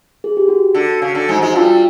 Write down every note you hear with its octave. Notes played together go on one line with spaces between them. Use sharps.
G#4
G4
F#4
D3
C#3
D3
G#2 G#3
G#2 G#3 F#4
G2 G3 F4